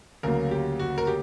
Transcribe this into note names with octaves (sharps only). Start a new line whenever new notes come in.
D2 C#3 F#3 A#3 A#4
G4
F#4
A#4
G4